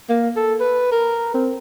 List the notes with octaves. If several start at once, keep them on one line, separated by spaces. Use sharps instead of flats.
A#3
A4
B4
A#4
C4